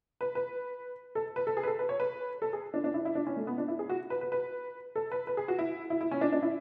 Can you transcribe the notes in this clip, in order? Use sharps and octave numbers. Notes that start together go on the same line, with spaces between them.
B4
B4
A4
B4
A4
G#4
B4
A4
B4
C#5
B4
A4
G#4
D4
D4
E4
E4
D4
C#4
A3
B3
D4
E4
G#4
F#4
B4
B4
B4
A4
B4
B4
G#4
F#4
E4
E4
E4
C#4
D4
D4
E4